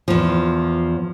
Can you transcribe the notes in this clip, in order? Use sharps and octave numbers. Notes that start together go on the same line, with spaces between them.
E2 F3